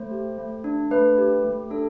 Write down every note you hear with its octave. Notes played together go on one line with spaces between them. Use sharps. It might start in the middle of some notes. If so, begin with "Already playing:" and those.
Already playing: A3 C5
G4
A3
D4
A3 B4
G4
A3
D4 A4